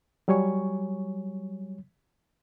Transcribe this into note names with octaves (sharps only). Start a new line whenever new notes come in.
F#3 G3 C#5 G#5 C#6